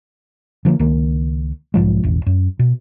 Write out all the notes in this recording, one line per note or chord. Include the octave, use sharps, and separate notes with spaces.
D3 F3 F#3 A#3
C#2 D#3 A#3
B1 G#2 F3 G#3
E1 A1
F#2
B2